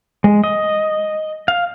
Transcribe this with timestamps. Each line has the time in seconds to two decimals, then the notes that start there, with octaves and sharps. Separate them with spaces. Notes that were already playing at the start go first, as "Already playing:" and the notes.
0.24 G#3
0.44 D#5
1.48 F5